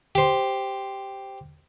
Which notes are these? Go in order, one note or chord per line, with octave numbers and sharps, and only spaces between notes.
G4 C5